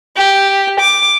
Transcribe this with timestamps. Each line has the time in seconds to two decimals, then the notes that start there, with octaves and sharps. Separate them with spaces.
0.16 G4
0.80 D6